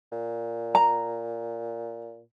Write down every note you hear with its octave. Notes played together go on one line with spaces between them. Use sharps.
A#2
A#5